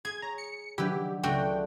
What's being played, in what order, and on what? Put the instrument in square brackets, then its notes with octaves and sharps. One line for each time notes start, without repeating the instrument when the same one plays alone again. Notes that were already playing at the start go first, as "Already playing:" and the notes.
[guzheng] G#4 [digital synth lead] G#6
[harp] C#5 [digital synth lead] A#5
[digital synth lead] C#7
[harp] D#3 F#3 D4 [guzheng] E4 B4 [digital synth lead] G4
[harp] C#2 [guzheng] A3 D4 F#4 [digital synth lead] G5